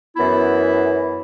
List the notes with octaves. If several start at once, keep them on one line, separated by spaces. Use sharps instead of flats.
F#2 E3 B3 E4